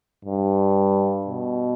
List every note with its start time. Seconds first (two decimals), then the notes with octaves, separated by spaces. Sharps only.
0.25 G2
1.27 B2